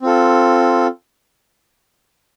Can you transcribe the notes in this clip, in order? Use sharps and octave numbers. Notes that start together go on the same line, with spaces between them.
C4 F4 A4